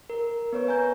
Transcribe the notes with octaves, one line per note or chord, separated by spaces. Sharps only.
A#4
B3 B4 C#5
G#5 A#5 G6